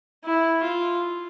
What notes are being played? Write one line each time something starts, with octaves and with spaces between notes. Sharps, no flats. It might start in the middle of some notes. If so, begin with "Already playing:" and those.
E4
F4